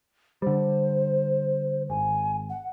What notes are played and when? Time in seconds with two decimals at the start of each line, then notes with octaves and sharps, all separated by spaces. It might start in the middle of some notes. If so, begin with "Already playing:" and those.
0.42 D3 G3 C5
1.90 G#1 G#5
2.50 F#5